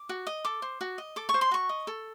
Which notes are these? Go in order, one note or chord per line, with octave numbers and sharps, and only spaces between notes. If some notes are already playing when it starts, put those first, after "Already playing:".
Already playing: D6
F#4
D#5
A4 D6
C5
F#4
D#5
A4 D6
C#6
C5
C6
F#4 C#6
D#5
A4